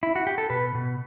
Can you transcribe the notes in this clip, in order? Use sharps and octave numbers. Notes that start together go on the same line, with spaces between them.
E4
F#4
G4
A4
B2 B4
B2